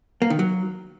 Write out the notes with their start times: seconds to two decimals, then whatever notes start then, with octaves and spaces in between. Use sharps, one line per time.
0.22 A#3
0.30 D#3
0.39 F#3